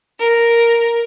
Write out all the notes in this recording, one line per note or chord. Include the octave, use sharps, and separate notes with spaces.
A#4